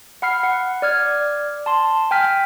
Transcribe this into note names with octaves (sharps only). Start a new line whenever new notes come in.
F#5 B5 F6 C7
F#5
D5 F6 G#6
A5 C6
G5 G#5 F6 B6